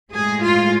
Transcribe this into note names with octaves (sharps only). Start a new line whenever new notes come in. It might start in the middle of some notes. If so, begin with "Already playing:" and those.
A2 G#3 G#4
F4